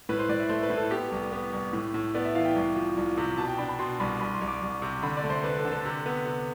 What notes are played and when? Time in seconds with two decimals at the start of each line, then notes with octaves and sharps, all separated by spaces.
0.09 A2 B4
0.19 C5
0.29 A2 D5
0.40 E5
0.49 A3 C5
0.63 B4
0.70 A2
0.77 A4
0.91 B3 G4
1.12 C2
1.32 B3
1.53 C2
1.73 A2
1.94 A2
2.14 B3 D5
2.25 E5
2.35 E3 F5
2.45 G5
2.56 C2
2.76 F3
2.97 C2
3.18 C3
3.38 B2 A5
3.48 G5
3.58 D4 B5
3.69 B5
3.79 B2 C6
4.00 C2 B5
4.21 C2 B5
4.35 C6
4.41 C2
4.48 D6
4.62 C2
4.82 C3
5.02 D3 B5
5.17 D5
5.24 A3
5.30 C5
5.44 D4 B4
5.58 A4
5.65 D3
5.72 A4
5.85 C3
6.06 B3
6.26 C3